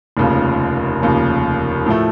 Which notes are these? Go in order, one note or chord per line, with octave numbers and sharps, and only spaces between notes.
F1 D#2 C#3 F3
F1 D#2 C#3 F3
A2 F3 A3